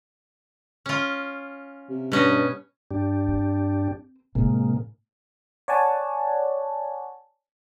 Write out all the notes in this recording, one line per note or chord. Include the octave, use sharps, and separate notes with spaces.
C#4 F4
C3
G2 B2 C#4 D#5
G2 D4 G4
C4
A2 C3 G#3 A#3 D#4
C#5 D5 F#5 G#5 A5